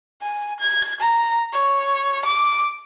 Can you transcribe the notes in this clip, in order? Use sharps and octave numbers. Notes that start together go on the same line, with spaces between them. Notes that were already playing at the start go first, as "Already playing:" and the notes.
G#5
G#6
A#5
C#5
D6